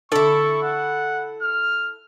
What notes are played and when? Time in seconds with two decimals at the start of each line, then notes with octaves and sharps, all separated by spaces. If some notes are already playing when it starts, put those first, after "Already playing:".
0.12 D3 E4 A4 C#6
0.62 F#5
1.42 F6